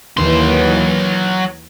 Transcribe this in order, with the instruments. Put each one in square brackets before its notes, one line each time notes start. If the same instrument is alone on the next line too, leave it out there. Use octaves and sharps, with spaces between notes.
[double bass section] D#2 E3 [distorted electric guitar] F#3 C6